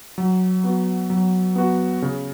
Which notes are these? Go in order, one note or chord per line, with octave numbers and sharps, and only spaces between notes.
F#3
B3 F#4
F#3
B3 F#4
C#3